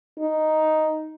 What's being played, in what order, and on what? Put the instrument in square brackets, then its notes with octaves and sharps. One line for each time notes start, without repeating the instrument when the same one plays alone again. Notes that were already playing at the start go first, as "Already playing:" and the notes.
[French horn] D#4